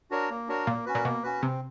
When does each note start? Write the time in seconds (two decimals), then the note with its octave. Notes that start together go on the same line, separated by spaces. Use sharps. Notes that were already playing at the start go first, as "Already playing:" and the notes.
0.11 D4 F#4 A#4 C#5
0.30 A#3
0.48 D4 F#4 A#4 C#5
0.66 A#2 A#3
0.86 C#4 F#4 B4
0.95 A#2
1.05 B2 A#3
1.23 C#4 F#4 B4
1.42 C3 C4